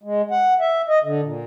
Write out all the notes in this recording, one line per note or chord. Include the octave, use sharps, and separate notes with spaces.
G#3
F#5
E5
D#5
D3
A#2